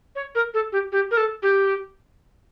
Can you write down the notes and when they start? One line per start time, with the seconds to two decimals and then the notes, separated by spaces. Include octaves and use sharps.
0.15 C#5
0.35 A#4
0.54 A4
0.72 G4
0.92 G4
1.11 A#4
1.17 A4
1.43 G4